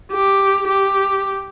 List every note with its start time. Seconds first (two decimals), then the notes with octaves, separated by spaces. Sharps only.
0.13 G4
0.67 G4